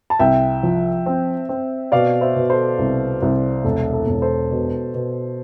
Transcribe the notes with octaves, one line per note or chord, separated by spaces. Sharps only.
A5
C2 E5 G5
F3
C4
C4
B2 D5 F5
C5 E5
B2
A4 C5
C2
C2
E1 A4
A4
E1
A4 C5
B2
B2